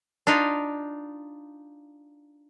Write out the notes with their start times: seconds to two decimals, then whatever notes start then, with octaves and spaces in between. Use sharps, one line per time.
0.27 D4 D#4 F4